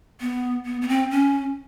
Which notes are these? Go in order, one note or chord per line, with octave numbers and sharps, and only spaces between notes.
B3
B3
B3
C4
C#4